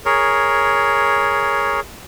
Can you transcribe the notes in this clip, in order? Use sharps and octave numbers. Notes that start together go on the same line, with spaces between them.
G#4 A#4 C#5